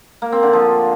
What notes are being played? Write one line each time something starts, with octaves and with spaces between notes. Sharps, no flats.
A#3
C4
D3
F3